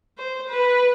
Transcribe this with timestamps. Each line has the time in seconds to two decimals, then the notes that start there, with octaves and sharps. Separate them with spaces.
0.18 C5
0.49 B4